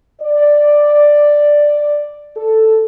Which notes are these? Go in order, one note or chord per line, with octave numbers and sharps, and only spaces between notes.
D5
A4